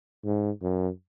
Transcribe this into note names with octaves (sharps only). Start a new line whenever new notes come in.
G#2
F#2